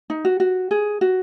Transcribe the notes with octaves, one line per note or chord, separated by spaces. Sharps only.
D#4
F#4
F#4
G#4
F#4